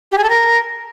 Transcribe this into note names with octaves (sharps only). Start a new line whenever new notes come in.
G4
G#4
A4
A#4